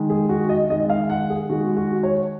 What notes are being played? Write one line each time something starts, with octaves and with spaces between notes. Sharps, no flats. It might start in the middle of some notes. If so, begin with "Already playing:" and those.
Already playing: D#3 G#3
G#4
F#4
D#5
D#3 G#3 D#5
D#5
F5
F#5
G#4
D#3 G#3 F#4
F#4
C#5